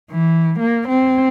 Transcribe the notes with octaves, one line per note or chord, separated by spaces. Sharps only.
E3
A#3
C4